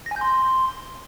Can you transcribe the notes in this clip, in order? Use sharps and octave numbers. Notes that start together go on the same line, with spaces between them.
A#6
G#5
G6
C6